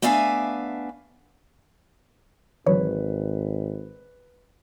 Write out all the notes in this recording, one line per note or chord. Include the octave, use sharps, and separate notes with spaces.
A3 B3 D4 E5 F5 G#5
G#1 D3 E3 F#3 B4 C#5